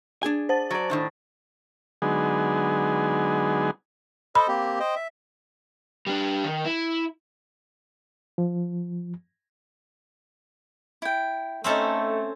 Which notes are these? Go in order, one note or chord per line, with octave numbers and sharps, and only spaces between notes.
D4 G#4 G#5
C5 A5 A6
F#3 D5
A2 D#3 D4
D3 F#3 G#3 B3 D#4 G#4
A4 C5 D#5 B5
A#3 C4 G4
C5 D#5 G5
E5
G3 D4
D#3
E4
F3
E4 G5
A3 C4 C#4 D#4 E4 A4 B5